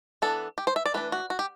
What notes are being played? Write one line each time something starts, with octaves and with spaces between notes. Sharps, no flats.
E3 B3 D4 A4
G4
C5
E5
D5
E3 A3 D4 B4
F#4
F#4
G4